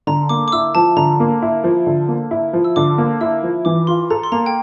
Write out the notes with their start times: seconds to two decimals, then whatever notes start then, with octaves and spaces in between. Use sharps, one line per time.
0.07 D3 A#5
0.29 A#3 D6
0.48 D6
0.52 E4 E6
0.75 F3 A5
0.97 D3 A#5
1.20 A#3
1.42 E4
1.64 F3
1.87 D3
2.08 A#3
2.31 E4
2.53 F3
2.64 E6
2.76 D3 D6
2.98 A#3
3.21 E4 E6
3.43 F3
3.65 E3 D6
3.87 F4 C6
4.10 A4 A#5
4.23 C6
4.32 A#3 A#5
4.46 G5